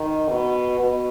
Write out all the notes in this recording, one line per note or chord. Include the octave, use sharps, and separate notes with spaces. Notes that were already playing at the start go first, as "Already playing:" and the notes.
Already playing: D#3
B2
B2